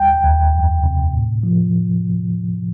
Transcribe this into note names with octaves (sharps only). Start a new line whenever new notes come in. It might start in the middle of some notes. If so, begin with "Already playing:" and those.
Already playing: D#2 G3 G5
D#2
F2
C3
A2
F3